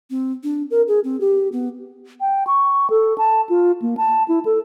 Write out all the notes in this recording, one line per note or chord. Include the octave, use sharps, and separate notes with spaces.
C4
D4
A#4
G#4
C4
G4
B3
G5
C#6
A4
A5
F4
A#3
A5
E4
A4